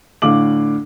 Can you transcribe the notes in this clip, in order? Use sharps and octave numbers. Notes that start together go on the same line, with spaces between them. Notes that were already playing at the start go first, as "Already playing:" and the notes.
A2 D3 F5 D6 F#7